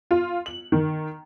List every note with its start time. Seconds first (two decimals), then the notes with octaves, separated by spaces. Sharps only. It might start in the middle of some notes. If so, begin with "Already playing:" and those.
0.11 F4
0.46 F#7
0.72 D#3